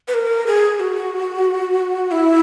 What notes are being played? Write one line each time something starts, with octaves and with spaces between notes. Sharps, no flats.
B4
A#4
G#4
F#4
E4